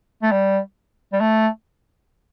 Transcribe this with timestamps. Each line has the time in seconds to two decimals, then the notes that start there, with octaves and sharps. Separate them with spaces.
0.23 A3
0.31 G3
1.13 G3
1.21 A3